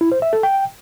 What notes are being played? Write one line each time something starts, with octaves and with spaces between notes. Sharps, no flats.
E4
C5
E5
A4
G5